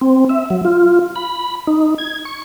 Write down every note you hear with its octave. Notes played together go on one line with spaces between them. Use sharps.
C4
E5
F#3
F4
B5
D#4
G#6
C#6